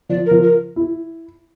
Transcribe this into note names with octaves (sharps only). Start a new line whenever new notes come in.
F3 D5
A#4
F3
A#4
E4